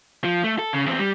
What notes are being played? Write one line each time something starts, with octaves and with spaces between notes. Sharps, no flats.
F3
A3
A4
C#3
E2 C4
G3